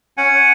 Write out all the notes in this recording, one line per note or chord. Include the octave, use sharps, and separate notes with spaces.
C#4 F#5 G#5